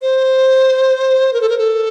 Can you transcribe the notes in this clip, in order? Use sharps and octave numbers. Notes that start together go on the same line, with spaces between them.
C5
A#4
A4
A#4
A4